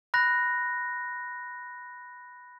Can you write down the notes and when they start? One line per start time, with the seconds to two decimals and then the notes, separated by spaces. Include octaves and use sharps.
0.14 B5 F#6 A#6